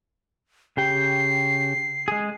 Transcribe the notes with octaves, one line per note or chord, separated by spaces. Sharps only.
C#3 G4 G5 C7
G#3 G#4